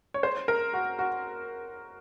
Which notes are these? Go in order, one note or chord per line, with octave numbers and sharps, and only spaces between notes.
C#5
C5
A#4
F#4
F#4